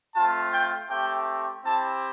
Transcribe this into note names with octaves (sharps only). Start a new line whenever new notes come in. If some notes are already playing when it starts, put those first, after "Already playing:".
A3 C4 F4 A5
G5
A3 C4 G4 G5
C4 E4 G4 A5